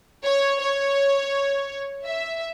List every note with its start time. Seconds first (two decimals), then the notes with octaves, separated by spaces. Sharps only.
0.25 C#5
0.61 C#5
2.05 E5